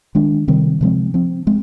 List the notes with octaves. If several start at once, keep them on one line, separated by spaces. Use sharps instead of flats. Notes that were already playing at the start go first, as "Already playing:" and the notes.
D#3 G#3 D4
C3 D#3 G3 C4
C3 F3 G#3 C4
F3 C4
G#3 C4